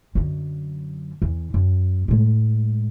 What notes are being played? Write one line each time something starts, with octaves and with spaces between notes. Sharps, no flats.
F#2 D3
E2
F#2
A2 G#3